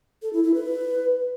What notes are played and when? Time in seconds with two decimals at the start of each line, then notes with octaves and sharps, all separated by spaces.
0.22 A4
0.33 E4
0.44 E4
0.54 B4